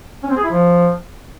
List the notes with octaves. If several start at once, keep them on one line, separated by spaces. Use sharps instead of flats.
C#4
C4
G#4
E4
F3